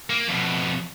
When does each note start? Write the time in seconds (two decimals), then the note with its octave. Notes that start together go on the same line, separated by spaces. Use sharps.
0.10 A#3
0.28 F2 B2